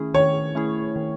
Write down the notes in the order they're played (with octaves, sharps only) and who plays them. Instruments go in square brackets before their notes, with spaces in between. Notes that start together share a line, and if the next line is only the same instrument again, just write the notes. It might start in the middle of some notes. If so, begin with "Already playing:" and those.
Already playing: [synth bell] D#3 A3 C#4 E4 G#4
[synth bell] D#3 [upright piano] C#5
[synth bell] A3 C#4 E4 G#4
D#3